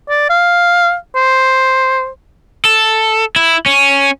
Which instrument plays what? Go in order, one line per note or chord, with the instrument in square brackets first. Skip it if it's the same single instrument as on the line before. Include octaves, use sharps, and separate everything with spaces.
[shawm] D5
F5
C5
[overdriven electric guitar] A4
E4
C#4